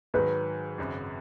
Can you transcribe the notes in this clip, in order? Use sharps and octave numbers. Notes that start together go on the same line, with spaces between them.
G#2 D#3 F#3 B4
G#1 F#2 C#3